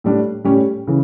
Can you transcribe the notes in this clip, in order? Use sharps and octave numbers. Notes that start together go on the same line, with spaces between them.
A2 G3 D4
A2 G3 C#4 G4
C#3 E3